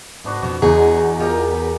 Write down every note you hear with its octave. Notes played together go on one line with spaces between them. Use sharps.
G#2 C#3 B3 D4 F#4
F2 B2 F3 F#4
E2 G#3 D#4 F#4 G#4
A#3 D#4 F4 G4 A#4
B4